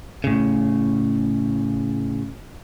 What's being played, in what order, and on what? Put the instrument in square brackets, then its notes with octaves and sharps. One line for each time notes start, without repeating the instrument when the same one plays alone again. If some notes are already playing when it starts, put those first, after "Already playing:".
[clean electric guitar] A2 C#3